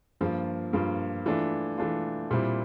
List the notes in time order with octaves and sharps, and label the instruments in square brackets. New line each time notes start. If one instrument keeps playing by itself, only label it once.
[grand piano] G2 F3 A#3 F4
G2 F3 A#3 F4
E3 A3 D4 F4
E3 A3 D4 F4
A#2 G3 C4 E4